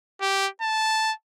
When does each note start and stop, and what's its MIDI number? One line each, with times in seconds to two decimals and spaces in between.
0.21 0.48 67
0.61 1.12 81